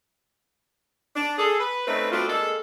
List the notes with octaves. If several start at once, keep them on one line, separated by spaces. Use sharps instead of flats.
D4
G#4 A4
B4
A3 C4 C#4 D#4 B4
A3 B3 C4 D4 F4 F#4
G#3 A#3 D4 A4